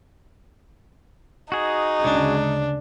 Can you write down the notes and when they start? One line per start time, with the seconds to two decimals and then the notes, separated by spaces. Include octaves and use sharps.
1.52 D#4 F#4 G#4
2.04 D2 C#3 G#3 D4